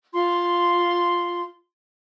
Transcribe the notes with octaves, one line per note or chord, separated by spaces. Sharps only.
F4 C6